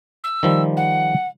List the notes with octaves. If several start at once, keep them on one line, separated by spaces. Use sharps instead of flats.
E6
D#3 F3 G3
F#5